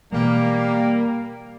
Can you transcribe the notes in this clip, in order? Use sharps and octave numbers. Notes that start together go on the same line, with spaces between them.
B2 E3 G3 G#3 A#3